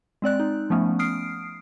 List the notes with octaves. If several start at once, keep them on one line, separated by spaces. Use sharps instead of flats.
G#3 C4 D5 F#6
D#4
F3 A3 B3 C#4
D#6 F6 C7 D7